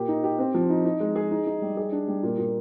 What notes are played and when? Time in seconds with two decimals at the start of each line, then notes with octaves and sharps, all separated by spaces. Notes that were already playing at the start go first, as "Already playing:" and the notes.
Already playing: A#2 G4
0.08 D#4
0.24 G4
0.39 C4
0.54 F3
0.70 D#4
0.85 D#4
1.00 G#3
1.16 G#4
1.31 D#4
1.47 D#4
1.62 G3
1.77 G#4
1.92 D4
2.08 G3
2.23 A#2
2.38 A#2